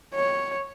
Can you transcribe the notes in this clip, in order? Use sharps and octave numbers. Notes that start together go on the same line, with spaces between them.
C#5